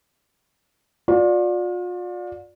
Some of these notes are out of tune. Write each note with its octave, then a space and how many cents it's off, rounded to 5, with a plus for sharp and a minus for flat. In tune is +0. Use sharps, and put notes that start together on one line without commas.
F4 +40 D5 +0